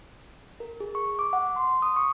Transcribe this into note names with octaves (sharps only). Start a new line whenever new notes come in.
A#4
G#4
C#6
D6
F#5
C6
D#6
C#6